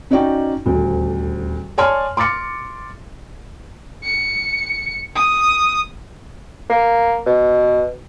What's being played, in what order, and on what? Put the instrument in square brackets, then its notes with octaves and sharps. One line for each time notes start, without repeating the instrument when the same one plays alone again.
[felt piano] C#4 D#4 F#4 D5 G5
D#1 D2
C#5 D5 G#5 A5 C6 F6
C6 D6 F6 A6 C#7
[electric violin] C#7
D#6
[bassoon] A#3
B2